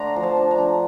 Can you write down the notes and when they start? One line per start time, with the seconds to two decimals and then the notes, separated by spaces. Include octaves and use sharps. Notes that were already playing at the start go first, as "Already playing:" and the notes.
Already playing: D3 A3 D4 A#5 C6
0.16 F3
0.23 A5
0.37 D4
0.51 A#5
0.59 D3